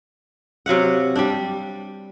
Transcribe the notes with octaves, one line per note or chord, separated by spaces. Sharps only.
C3 F#3 F5 F#5
G3 D4